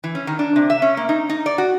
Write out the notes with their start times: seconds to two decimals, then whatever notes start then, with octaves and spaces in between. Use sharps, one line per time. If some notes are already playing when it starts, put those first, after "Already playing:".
0.04 E3
0.15 C#4
0.27 D#3
0.39 D4
0.56 C3
0.70 E5
0.82 C#4
0.97 A#3
1.09 D#4
1.29 D#4
1.46 D5
1.58 F#4